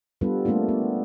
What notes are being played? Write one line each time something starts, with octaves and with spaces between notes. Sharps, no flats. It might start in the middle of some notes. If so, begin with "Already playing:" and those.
G3 B3 D4 F4 A4 B4
G3 A3 A#3 C4 D4 F4
B3